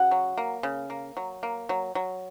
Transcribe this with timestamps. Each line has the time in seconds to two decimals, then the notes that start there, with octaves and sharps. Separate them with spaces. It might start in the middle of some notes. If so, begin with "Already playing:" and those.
Already playing: C#3 F#4 F#5
0.11 F#3
0.38 A#3
0.63 C#3
0.90 A#3
1.17 F#3
1.43 A#3
1.69 F#3
1.95 F#3